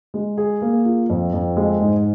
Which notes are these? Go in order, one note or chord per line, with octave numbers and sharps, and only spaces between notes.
G#3
G#4
A#3
F4
F2
F2
G#3
G#2